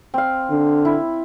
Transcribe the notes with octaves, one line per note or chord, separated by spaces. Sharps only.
C4 F5
D3
E4